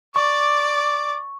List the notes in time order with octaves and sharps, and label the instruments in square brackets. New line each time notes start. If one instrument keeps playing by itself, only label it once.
[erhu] D5 [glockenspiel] C#6 [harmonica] D6